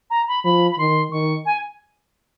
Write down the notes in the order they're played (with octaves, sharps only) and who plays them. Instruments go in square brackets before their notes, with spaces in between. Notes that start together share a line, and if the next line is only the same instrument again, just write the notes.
[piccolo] A#5
B5
[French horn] F3 [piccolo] B5
[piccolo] B5
[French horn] D#3 [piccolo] C6
[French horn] D#3 [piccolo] C#6
[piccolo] G#5